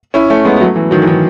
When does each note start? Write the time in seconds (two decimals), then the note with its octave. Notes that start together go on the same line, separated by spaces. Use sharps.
0.14 C#4 E4
0.30 A3 C#4
0.45 G#3 B3
0.56 B3
0.60 F#3 A3
0.76 E3
0.91 D#3 F#3
1.02 E3
1.07 D#3